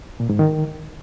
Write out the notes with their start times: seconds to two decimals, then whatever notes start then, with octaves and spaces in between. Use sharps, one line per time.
0.20 A#2
0.29 G#2
0.39 D#3